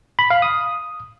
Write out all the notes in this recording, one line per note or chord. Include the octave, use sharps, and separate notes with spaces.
B5
F5
D#6